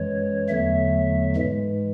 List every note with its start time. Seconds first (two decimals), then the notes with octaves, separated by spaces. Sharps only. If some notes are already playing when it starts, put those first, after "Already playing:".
Already playing: F#2 E3 G#3 C#5
0.49 E2 D3 F#3 A3 E5
1.36 G#2 E3 G#3